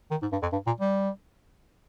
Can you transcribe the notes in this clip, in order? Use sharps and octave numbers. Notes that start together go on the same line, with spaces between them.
D#3
G#2
G2
F2
G2
A#2
G3